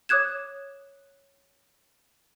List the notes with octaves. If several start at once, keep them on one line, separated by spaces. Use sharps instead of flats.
C#5 D6 D#6 F#6 G#6 E7